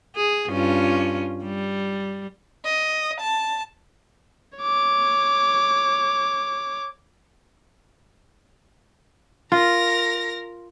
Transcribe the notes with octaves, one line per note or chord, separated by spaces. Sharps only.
G#4
G2 C#4 F4
G3
D#5
A5
C#5 D6
F4 A#4 A#6